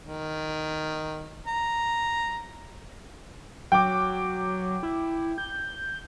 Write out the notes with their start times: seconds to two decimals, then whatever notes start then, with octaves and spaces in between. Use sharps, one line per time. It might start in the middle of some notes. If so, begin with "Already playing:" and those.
0.03 D#3
1.46 A#5
3.72 F#3 G5 D6
4.83 E4
5.38 G6